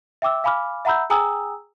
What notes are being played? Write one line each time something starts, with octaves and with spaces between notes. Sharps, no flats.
E5 G5 D6 E6
F5 G#5 B5 D6 F6
E5 F#5 A#5 B5 E6 G6
G#4 G5 G#5 A#5 D#6 E6